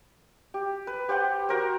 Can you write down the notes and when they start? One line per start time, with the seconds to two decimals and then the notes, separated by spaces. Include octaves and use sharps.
0.54 G4
0.87 B4
1.09 G4 C5 F#5 G5
1.49 F#4 A#4 C5